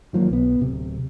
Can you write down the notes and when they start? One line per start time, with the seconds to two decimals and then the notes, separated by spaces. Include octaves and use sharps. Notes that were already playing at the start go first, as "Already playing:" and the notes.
0.13 D#3 F3 F#3 A#3
0.30 B1 B3
0.60 D1 C3